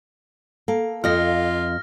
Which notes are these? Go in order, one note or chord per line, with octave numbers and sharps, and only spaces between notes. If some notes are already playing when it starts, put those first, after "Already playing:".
A#3 A4
F2 F4 D#5 F6 A#6